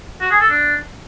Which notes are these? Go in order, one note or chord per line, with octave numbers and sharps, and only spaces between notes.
F#4
G#4
A4
D4